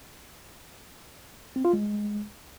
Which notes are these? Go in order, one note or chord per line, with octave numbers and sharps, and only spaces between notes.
C4
F4
G#3